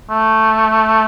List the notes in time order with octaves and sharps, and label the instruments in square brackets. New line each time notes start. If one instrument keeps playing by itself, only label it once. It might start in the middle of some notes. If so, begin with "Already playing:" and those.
[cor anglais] A3